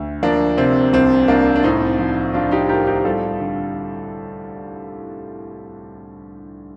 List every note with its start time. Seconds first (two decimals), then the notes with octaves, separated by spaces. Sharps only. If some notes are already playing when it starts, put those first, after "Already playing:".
Already playing: D2
0.23 F3 A#3 D4
0.57 C3 C4
0.93 C2 C4
1.28 C2 A#3 D4
1.56 D4
1.63 A2 C4 D#4
1.99 F3
2.34 F3 D4 F4
2.51 D#4 G4
2.69 A2 G4 A#4
2.87 D#4 G4
3.05 G3 F4 A4
3.40 D3